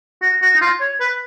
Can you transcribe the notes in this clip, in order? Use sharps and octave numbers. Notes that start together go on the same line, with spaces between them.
F#4
F#4
D#4
F4
C#5
B4